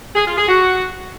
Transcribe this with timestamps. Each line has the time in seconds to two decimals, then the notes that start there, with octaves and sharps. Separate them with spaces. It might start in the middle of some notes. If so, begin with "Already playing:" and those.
0.15 G#4
0.26 F4
0.37 G#4
0.48 F#4